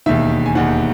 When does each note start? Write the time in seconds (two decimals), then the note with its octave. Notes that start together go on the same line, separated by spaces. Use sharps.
0.06 E1 D#2 D#3 E5
0.46 G#5
0.55 E1 D#2 D#3 F#5